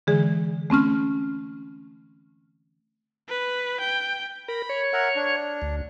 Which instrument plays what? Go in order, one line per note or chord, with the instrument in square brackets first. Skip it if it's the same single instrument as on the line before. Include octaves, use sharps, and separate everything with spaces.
[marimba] D3 E3 G#3 G#4
A3 C4 C#4 F6
[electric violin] B4
G5
[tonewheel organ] A#4 [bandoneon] B5
[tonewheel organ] C#5
[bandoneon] A#4 E5 F#5
D4
[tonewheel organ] D2